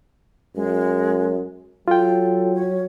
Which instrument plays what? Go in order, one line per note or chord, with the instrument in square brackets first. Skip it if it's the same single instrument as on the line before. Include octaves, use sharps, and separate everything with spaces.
[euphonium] F#2 [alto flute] G#3
[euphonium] F#3 [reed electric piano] F4 G5 [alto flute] A4
[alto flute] C#5